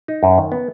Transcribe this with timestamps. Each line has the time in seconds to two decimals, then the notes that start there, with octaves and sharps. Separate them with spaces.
0.08 D#4
0.23 F#2
0.38 D#3
0.52 B3